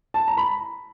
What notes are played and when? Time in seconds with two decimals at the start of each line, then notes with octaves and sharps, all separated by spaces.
0.14 A5
0.28 A#5
0.37 B5